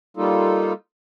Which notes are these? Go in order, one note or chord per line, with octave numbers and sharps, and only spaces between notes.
G3 A#3 D#4 F4 A4